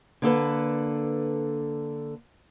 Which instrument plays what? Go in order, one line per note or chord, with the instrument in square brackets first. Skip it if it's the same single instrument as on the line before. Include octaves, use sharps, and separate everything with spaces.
[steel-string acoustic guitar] D3 A#3 A4 B4